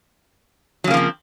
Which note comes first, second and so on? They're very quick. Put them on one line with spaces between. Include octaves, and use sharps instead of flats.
F#3 C#3 A#3 F3 C4